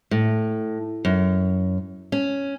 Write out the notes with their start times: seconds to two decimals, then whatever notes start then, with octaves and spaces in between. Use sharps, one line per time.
0.11 A2
1.05 F#2
2.12 C#4